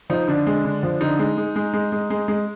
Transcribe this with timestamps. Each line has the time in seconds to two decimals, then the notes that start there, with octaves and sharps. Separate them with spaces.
0.10 F3 D#4
0.28 D3 D4
0.47 G#3
0.64 D3
0.83 F3
1.01 D3 D#4
1.19 G#3
1.37 G#3
1.56 G#3
1.73 G#3
1.92 G#3
2.10 G#3
2.28 G#3